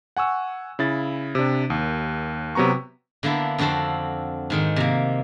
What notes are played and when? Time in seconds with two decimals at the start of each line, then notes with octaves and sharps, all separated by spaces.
0.17 F#5 G#5 C#6 E6
0.79 C#3 E4 A6
1.35 C3 D4
1.70 D#2
2.55 C3 F#3 B3 A#5 C#6
3.23 D3 A#3 B3 E4 A4
3.58 F2 D3 C4 F#4 A4 C5
4.50 G#2 D#3 C5
4.76 C3 A#3